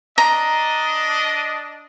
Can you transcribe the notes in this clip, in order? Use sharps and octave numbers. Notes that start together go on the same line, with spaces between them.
D4 D#5 A#5